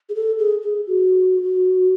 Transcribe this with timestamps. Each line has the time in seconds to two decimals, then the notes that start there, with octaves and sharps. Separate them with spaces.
0.09 G#4
0.15 A4
0.39 G#4
0.62 G#4
0.87 F#4